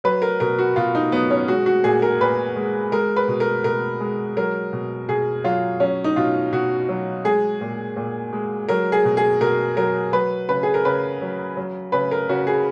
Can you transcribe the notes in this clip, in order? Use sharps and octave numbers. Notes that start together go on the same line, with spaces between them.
F#3 B4
A#4
B2 A#4
F#4
B2 F4
D#4
F#3 B3
C#4
G#3 F#4
F#4
A#2 G#4
A#4
A#2 B4
G#3
G#3 A#4
B4
B2
A#4
B2 A#4
G#3
F#3 A#4
B2
B2 G#4
F#3 F4
F#3 C#4
D#4
B2 F4
B2 F#4
F#3
G#3 G#4
A#2
A#2
G#3
F#3 A#4
G#4
B2
G#4
B2 A#4
F#3 A#4
F#3 B4
C#3 B4
G#4
A#4
C#3 B4
F#3
F#3
C#3 B4
A#4
C#3 F#4
G#4